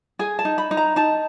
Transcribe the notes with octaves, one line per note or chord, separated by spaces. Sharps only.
G#4 G#5
A5
D#4
B5
D#4
A#5
D#4 A5